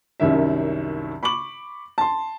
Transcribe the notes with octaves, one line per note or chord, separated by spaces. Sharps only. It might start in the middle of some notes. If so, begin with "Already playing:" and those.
C2 F#2 D#3 C#4 E5
B5 C#6 D6 F#7
A5 C6